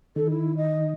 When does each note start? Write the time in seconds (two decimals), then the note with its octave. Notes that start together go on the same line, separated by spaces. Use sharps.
0.16 D#3 A4
0.30 E4
0.57 D#5